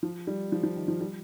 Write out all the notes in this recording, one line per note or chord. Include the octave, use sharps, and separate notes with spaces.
F3
G3
F3
F3
D#3
F3
G3